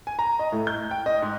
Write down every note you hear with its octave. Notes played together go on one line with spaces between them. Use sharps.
G#5
A#5
D#5
A2
G6
G5
D#5
G#2